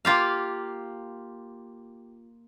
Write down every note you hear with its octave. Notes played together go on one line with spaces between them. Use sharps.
A#3 F4 G4 F5